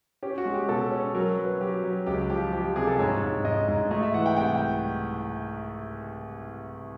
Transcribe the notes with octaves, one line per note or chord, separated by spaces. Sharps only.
C#4 G4
F#4
G#3
G4
B2 A4
C#4
F#3 A#4
F#3 B4
F#3 G4
F#3
C#2 G4
F3 G4
F3 G4
G4
C3 G#4
A4
G#2 C#5
G#2
G#2 D#5
G#2
A3 D#5
E5
E3 F#5
G5
C2 G5
G5